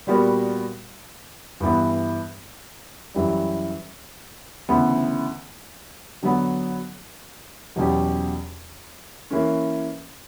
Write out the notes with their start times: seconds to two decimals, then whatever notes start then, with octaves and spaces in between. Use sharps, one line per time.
0.07 A#2 G3 B3 F#4 A#4
1.60 G2 E3 B3
3.14 F#2 E3 G3
4.69 D2 C#3 E3 B3
6.23 D3 F#3 B3
7.76 E2 B2 F#3 C#4 G4
9.31 E3 A#3 C#4